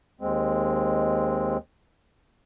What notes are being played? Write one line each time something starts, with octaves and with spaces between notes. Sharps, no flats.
D#2 G#3 C4